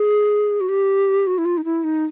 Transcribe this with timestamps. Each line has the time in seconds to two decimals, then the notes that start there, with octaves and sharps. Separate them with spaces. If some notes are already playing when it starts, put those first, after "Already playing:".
Already playing: G#4
0.61 F#4
0.69 G4
1.27 F#4
1.38 E4
1.45 F4
1.58 D#4
1.65 E4
1.84 D#4